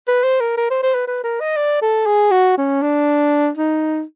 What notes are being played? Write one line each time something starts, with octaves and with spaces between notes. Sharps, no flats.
B4
C5
A#4
A#4
C5
C5
B4
B4
A#4
D#5
D5
A4
G#4
F#4
C#4
D4
D#4